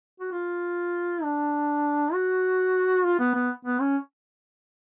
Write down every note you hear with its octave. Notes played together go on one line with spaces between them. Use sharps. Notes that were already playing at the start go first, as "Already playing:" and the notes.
F#4
F4
D4
F#4
F4
B3
B3
B3
C#4